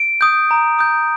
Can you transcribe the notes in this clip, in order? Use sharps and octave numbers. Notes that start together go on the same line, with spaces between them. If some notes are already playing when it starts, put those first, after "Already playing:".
Already playing: D7
D#6 G6
A#5
D#6 G6